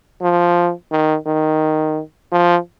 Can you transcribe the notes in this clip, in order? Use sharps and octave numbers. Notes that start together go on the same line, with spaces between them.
F3
D#3
D#3
F3